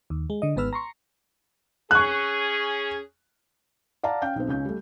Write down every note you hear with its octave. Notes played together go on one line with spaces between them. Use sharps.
D#2
G#3
D3 D#5
G#1 G#2 B3 B4 E6 F6
A#5 C6 C#6
C#4 G#4 C#6 F#6
D5 F5 F#5 A5 A#5
C#4 F5 G5 G6
B1 C4
C#2 C#4 G6
G3 A3